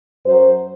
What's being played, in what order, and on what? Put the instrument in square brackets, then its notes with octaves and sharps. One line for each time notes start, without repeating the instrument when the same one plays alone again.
[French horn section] F#2 F#3 C5